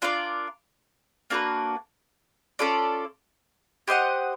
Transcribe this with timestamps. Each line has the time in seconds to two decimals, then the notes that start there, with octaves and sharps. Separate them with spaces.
0.02 D4 F4 A#4 D5
1.30 A#3 D4 F#4 B4
2.59 C#4 F4 A4 D5
3.87 G4 C5 D#5 F#5